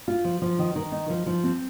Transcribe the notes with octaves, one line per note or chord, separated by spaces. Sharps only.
F4
F3
F3
D#3
D#3
D#4
F3
F3
C4